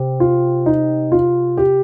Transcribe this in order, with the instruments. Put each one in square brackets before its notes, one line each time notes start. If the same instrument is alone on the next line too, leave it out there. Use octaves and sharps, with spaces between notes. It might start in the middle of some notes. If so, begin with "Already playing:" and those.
Already playing: [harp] C3
[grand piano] F4
D#4
F4
G4